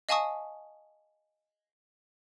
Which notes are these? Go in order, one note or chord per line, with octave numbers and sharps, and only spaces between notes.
D#5 F5 G#5 A5 C#6 D#6